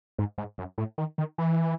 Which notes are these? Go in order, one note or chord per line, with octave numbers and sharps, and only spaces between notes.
G#2
G#2
F#2
A2
D#3
D#3
E3